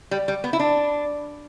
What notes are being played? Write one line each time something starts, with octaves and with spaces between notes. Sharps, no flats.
G3
G3
B3
E4
D4